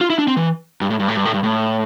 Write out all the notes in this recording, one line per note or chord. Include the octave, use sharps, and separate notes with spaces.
F4
E4
D4
C4
E3
G2
A2
G2
A2
G2
A2
G2
A2